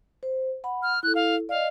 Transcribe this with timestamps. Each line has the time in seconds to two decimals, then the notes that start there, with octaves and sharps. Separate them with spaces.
0.23 C5
0.64 F#5 B5
0.82 F6
1.03 E4 A4 F#6
1.15 F5
1.49 D5 D#5 F5